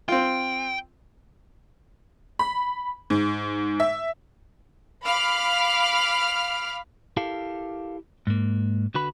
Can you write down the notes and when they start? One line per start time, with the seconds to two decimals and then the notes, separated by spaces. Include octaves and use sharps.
0.09 C4 F4 G5
2.39 B5
3.10 G#2
3.80 E5
5.04 F5 B5 D6 F6
7.17 E4 G4 A4 A#4 F5
8.27 G#2 A#3
8.94 D3 F#4 B4 B5